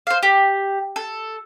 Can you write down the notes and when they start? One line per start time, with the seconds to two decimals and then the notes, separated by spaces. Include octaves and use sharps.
0.07 C5 F5
0.23 G4
0.96 A4